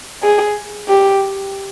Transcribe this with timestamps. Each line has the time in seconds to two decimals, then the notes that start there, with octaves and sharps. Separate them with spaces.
0.23 G#4
0.88 G4